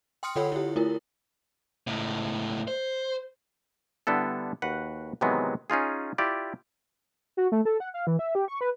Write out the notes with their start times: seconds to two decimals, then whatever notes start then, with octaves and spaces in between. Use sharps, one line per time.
0.23 G5 C6 D#6 F6 C#7
0.36 D3 F4 A4 C#5 F#5 B5
0.52 E4 G4
0.76 A3 E4 F4 A#4
1.87 C#2 A2
2.68 C5
4.07 D3 G3 B3 E4 A4
4.62 D#2 F#4 B4 F#5
5.21 C3 D#3 E3 F#3 G#3 B3
5.70 C#4 D#4 F4 G#4
6.18 E4 F4 G4 D5
7.37 F#4
7.52 A3
7.65 A4
7.80 F#5
7.94 F5
8.07 E3
8.19 E5
8.35 G4
8.48 C#6
8.61 B4